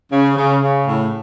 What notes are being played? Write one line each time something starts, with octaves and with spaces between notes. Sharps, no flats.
C#3
C#3
C#3
A2